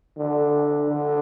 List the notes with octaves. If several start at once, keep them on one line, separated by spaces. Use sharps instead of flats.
D3
D3